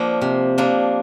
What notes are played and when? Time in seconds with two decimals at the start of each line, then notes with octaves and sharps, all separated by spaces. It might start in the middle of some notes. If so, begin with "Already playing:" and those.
Already playing: F3 A#3 D4
0.21 C3
0.58 F3 A#3 D4